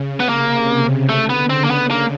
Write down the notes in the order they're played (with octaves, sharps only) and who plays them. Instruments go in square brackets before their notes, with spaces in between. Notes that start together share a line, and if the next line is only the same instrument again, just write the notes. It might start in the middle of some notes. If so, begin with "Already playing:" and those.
Already playing: [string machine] C#3
[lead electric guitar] B3
[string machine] C3 [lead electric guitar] A#3
[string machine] C#3
[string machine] D3 [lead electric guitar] A3
[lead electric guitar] B3
[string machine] C#3 [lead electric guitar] C4
[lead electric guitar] A#3
B3
A#3